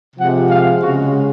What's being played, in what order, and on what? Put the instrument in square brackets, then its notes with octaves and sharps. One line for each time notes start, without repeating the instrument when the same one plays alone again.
[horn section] C3 F3 G#3 F#5
F5
C#3 G#3 F#4